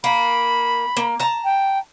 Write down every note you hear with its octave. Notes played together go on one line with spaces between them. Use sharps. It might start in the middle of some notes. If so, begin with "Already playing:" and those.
A#3 B5
A#3
A5 A#5
G5